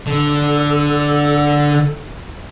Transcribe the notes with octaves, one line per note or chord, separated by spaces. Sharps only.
D3 A4